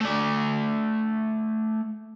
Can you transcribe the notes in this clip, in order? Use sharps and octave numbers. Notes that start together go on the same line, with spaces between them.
A3 D5